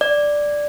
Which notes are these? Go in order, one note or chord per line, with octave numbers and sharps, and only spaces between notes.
D5